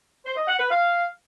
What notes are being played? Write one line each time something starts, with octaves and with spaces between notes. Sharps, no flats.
C5
D#5
F#5
B4
F5